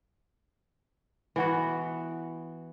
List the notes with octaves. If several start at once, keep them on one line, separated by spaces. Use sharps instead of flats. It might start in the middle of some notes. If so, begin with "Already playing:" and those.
E3 B3 F#4